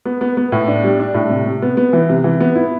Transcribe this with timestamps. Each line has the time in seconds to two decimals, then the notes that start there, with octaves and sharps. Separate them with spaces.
0.05 B3
0.21 B3
0.37 B3
0.52 A2
0.68 D4
0.83 G3
1.00 D4
1.14 A2
1.30 C3
1.46 C3
1.62 B3
1.77 B3
1.93 E3
2.09 C3
2.24 E3
2.40 B3
2.56 E4